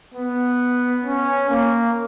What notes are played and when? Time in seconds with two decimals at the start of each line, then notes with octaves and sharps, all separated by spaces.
0.14 B3
1.04 C#4
1.49 A#3